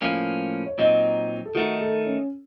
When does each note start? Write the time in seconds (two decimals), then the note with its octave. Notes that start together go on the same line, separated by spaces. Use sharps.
0.01 A2 F3 A#3 C#4 F5
0.66 C#5
0.78 A#2 F#3 C4 D#4 D#5
1.46 A4
1.55 D#3 A3 D#4 F#4
1.81 A4
2.06 C#4